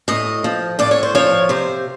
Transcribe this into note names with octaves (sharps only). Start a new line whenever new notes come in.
A2 D#5
F3
A2 D5
C#5
C5
F3 C#5
C3 C5